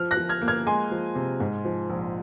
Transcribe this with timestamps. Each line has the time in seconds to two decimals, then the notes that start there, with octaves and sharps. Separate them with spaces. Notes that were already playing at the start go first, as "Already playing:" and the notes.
Already playing: F3 F6
0.11 F#6 A#6
0.17 F3
0.29 F6 G#6
0.42 A#3
0.48 F6 G#6
0.66 G#3 G#5 C6
0.91 F3
1.15 C3
1.40 G#2
1.65 F3
1.90 A#1